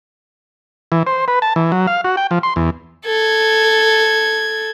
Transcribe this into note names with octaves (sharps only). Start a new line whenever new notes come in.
E3
C5
B4
A5
E3
F#3
F5
F#4
G5
F3
C6
E2
A4 G#6